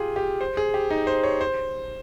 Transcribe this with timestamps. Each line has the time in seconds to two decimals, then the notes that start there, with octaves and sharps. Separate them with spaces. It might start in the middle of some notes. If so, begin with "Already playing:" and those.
Already playing: F4 G4 G#4
0.16 G4
0.41 C5
0.57 G#4
0.74 G4
0.90 D#4
1.07 C5
1.24 C#5
1.41 C5